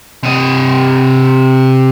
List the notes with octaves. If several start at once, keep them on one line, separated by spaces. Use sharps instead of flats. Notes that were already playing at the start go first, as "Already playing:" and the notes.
C3 D#5